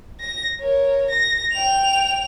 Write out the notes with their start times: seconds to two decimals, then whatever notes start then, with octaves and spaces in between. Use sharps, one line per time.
0.21 A#6
0.60 A#4 C#5
1.10 A#6
1.52 G5 F7